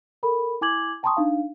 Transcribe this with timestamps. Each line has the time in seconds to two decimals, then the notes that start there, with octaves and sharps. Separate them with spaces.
0.23 A4 A#4 B5
0.61 E4 G#5 D6 G#6 F#7
1.03 G5 A5 A#5 C6 C#6 D#6
1.17 D4 D#4 F5